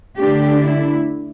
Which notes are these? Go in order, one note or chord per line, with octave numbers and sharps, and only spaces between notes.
D3 A3 D4 G4
E4